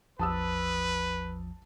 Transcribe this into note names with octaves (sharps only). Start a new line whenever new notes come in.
A1 E2 F3 B4 A5 D#6 E6